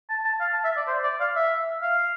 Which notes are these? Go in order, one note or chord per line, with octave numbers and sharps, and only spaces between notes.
A5
A5
F5
A5
E5
D5
C5
D5
F5
E5
F5